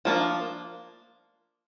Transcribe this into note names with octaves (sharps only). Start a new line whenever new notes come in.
F3 A#3 D4